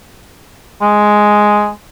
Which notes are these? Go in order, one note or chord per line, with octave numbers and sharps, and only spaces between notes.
G#3